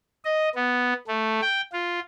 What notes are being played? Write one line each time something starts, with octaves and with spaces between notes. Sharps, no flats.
D#5
B3
A3
G5
F4